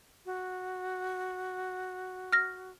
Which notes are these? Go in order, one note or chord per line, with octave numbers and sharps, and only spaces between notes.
F#4
F6 A#6